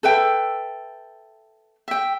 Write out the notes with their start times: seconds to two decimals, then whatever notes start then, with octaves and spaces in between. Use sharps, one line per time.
0.03 A4 B4 E5 G5
1.88 E5 G5